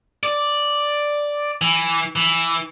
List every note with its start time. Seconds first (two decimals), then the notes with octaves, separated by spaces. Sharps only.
0.23 D5
1.61 E3
2.16 E3